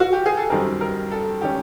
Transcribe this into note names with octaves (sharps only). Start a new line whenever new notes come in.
F#4
G4
G#4
A4
F#2 D#3 G3 C4 A#4
A#4
A4
D#3 G#3 C#4 G4